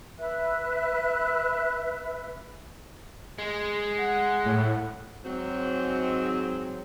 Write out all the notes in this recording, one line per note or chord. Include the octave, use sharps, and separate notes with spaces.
B4 E5 F#6
G#3
F#5
A2
G#2 F#3 C4